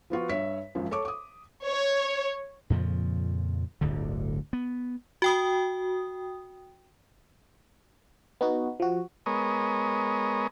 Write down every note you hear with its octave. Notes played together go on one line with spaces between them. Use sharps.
F3 B3 F4 F#4
G2 C#5 E5 B6
G#1 F#2 F3
A4 C#5 C#6 D6
D6 D#6
C#5
F2 A#2 C#3 F3
D1 G1 D2 D3
B3
F#4 G5 D#6
B3 D#4 F#4
F3 F#4
G#3 B3 A#4 C#5 D#5